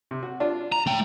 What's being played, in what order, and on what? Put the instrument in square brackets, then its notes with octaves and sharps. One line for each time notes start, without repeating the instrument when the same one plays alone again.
[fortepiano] C3
F#4
D4 F4
[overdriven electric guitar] A#5
A3 G5